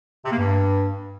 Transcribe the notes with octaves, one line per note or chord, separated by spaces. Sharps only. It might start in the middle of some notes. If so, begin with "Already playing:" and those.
C3
A#3
G2